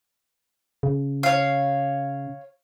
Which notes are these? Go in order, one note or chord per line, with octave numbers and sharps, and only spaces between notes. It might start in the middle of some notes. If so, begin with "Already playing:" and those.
C#3
C#5 F5